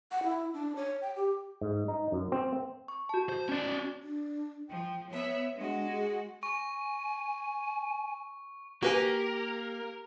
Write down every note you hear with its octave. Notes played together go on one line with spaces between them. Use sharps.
F#5
E4
D4
C#5
G5
G4
G#2
D#4
F#2
C4
C#6
F#4 A5
C5
C#4 D5
D4
F3 G5
B3 C#5 E5
G#3 D4 F#4
G#4
G#5 C#6
A#3 F#4 G4 A#4 B4 G#5